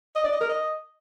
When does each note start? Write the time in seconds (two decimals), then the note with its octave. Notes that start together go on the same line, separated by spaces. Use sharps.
0.16 D#5
0.24 D5
0.32 D#5
0.41 A#4
0.49 D#5